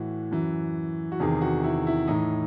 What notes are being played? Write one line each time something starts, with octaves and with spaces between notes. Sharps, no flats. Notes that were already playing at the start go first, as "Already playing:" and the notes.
Already playing: A2 E3 F#4
F#2 E3
F#4
E2 C3 D#3 G#4
F#4
E4
E4
A2 E3 D#4